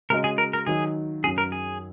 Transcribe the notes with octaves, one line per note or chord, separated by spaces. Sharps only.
C#3 G#3 F#4 A#4 D#5
G#4
A#4
A#4
D#3 F#3 D#4 G#4
F#2 F#3 C#4 G#4
A#4
G#4